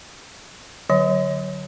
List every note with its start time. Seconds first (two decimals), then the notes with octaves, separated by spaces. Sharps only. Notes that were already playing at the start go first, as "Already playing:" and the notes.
0.90 D3 F#3 C#5